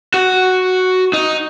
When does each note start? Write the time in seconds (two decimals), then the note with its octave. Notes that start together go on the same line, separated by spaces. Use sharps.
0.14 F#4
1.13 D#4